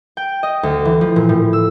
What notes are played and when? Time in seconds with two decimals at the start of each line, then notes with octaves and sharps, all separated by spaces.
0.17 G5
0.43 D#5
0.63 D2
0.85 E3
1.01 F3
1.16 A#2
1.29 A2
1.53 E6